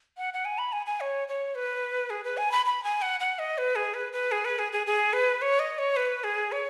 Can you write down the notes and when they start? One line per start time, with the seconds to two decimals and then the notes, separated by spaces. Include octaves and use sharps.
0.17 F#5
0.34 F#5
0.45 G#5
0.58 B5
0.72 G#5
0.86 G#5
1.00 C#5
1.28 C#5
1.55 B4
2.10 G#4
2.24 B4
2.37 G#5
2.52 B5
2.65 B5
2.84 G#5
3.02 F#5
3.20 F#5
3.39 D#5
3.58 B4
3.75 G#4
3.94 B4
4.13 B4
4.31 G#4
4.45 B4
4.59 G#4
4.72 G#4
4.86 G#4
5.13 B4
5.42 C#5
5.59 D#5
5.78 C#5
5.96 B4
6.24 G#4
6.52 C#5